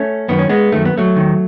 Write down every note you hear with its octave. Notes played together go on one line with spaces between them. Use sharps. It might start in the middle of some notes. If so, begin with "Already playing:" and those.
Already playing: A3 C#4
F#2 D#3 B3
C#4
G#3 B3
F#2 D#3 A3
B3
F#3 A3
E2 D#3